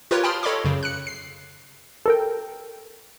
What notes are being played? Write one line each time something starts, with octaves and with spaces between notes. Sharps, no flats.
F4 G4 A#4 B4 C#5
G5 A5 B5 C6 D#6 F6
A4 C#5 D#5 B5 C6 D6
F#2 C#3
F#6 C#7
C7
A4 A#4 G5